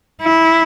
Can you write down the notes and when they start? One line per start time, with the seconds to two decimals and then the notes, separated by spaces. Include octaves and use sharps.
0.21 E4